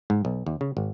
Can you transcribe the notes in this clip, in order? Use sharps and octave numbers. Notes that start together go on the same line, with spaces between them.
G#2
B1
D#2
C#3
G#1